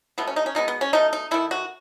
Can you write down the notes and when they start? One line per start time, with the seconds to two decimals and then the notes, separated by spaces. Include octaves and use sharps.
0.18 B2 A3 B3
0.27 C#4
0.36 D#4
0.46 C#4
0.55 B2 G#3 B3 D#4
0.68 B3
0.81 C#4
0.93 B2 A3 D#4
1.13 D#4
1.31 D#3 A3 E4
1.51 F#4